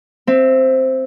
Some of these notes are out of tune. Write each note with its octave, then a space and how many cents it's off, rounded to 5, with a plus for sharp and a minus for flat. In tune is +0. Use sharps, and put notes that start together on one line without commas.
C4 +0 E5 +20